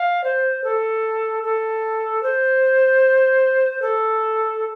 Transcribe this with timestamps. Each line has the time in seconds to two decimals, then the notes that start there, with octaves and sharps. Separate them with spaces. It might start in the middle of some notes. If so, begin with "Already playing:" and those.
Already playing: F5
0.24 C5
0.64 A4
1.43 A4
2.23 C5
3.82 A4